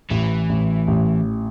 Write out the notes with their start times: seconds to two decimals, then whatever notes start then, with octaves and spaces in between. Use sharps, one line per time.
0.10 A1 E3
0.49 A1
0.88 A1